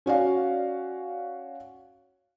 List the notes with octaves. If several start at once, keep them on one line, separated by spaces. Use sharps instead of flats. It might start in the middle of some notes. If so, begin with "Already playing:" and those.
C#4 F#4 D5 F5